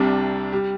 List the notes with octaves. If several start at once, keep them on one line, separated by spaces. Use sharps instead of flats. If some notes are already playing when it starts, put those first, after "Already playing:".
Already playing: C2 C3 G3 D4
G3